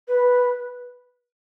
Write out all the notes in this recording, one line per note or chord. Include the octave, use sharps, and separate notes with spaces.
B4